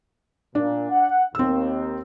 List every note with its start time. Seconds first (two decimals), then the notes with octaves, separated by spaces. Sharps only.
0.55 A#2 D4
0.90 F#5
1.35 D#2 C4 E6